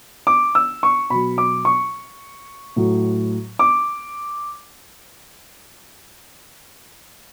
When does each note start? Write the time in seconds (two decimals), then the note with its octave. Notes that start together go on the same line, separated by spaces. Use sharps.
0.27 D6
0.55 E6
0.83 C#6
1.10 B2 F#3 B5
1.38 D6
1.65 C#6
2.76 A2 F#3
3.59 D6